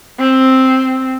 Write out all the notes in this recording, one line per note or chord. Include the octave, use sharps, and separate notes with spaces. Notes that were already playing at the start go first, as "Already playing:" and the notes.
C4